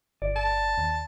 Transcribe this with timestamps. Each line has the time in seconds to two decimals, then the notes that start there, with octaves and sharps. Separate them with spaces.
0.22 G1 D5
0.36 A5
0.78 D#2